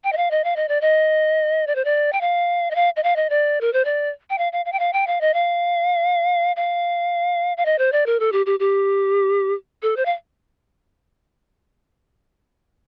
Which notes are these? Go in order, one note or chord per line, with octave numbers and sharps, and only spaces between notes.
G5
D#5
F5
D#5
F5
D#5
D5
D#5
D5
C5
D5
G5
F5
D#5
F5
D#5
F5
D#5
D5
A#4
C5
D5
G5
F5
F5
F5
G5
F5
G5
F5
D#5
F5
F5
F5
D#5
C5
D5
A#4
A4
G4
G4
G4
A4
C5
F5